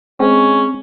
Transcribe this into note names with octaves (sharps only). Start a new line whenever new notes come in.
G#3 C4 C#4